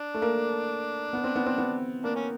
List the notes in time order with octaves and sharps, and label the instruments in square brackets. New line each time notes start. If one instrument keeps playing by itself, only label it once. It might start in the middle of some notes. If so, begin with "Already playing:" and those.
Already playing: [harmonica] D4
[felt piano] A3
A#3
B3
C4
B3
C4
B3
[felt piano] A#3 [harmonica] D4
[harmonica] C#4